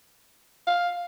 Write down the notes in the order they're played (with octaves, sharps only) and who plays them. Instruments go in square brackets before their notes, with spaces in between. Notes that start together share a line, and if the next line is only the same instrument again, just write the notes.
[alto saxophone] F5